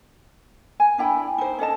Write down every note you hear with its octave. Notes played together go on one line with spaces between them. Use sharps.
G#5
D4 E4 G5 B5
D#4 C5
C#4 A4 D#5 A5